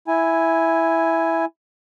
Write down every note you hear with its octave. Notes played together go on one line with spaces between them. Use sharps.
E4 G#5